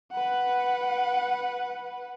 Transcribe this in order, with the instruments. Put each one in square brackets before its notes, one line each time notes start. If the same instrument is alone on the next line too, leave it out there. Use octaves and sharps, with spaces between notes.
[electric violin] B4 F#5